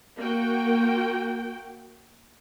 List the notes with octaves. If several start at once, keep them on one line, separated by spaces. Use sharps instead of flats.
A#3 F#4 G5